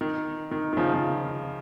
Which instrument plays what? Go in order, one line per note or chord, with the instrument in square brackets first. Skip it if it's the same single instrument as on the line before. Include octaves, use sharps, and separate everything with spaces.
[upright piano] D#3
D#3
D#3
C#3 F3
F3